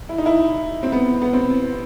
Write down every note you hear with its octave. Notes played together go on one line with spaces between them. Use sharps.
E4
D#4
E4
C4
B3
B3
C4